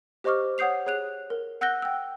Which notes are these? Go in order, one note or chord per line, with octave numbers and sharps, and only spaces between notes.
G4 C5 D#5 C#6 D6 F6
C#5 F#5 D#6 G6 C7 F7
G#4 C#5 F#6 F7
A#4
F#5 E6 F#6 G6 A#6 G7
G5 E6